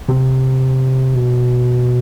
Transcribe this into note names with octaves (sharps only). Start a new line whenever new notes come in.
C3
B2